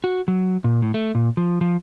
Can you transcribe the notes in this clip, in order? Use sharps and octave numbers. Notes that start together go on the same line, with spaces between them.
F#4
F#3
A#2
A2
A3
A#2
F3
F3